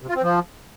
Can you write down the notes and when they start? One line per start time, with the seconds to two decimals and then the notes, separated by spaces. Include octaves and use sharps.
0.02 C3
0.09 F4
0.16 C4
0.23 F3